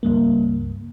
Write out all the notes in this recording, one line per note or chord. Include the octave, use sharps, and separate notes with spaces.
C#2 G2 A#3